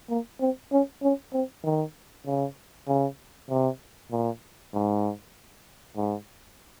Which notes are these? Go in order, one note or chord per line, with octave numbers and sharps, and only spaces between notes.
A#3
C4
C#4
C#4
C4
D#3
C#3
C#3
C3
A#2
G#2
G#2